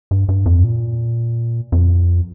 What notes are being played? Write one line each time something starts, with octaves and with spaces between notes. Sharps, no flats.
G2
G2
F2
A#2
F2